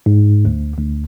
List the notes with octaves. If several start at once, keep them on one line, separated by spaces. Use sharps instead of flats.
G#2
D2
D2